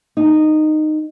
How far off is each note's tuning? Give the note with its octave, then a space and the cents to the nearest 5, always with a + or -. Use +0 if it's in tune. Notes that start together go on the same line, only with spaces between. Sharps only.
D#4 -15